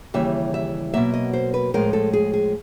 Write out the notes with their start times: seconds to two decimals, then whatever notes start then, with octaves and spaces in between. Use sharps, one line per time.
0.14 D#2 C#3 E3 G3 E5
0.54 E5
0.94 B2 F#3 A#3 E5
1.14 D#5
1.33 C5
1.54 B4
1.74 A2 F3 G#3 A#4
1.93 A4
2.13 G#4
2.34 G#4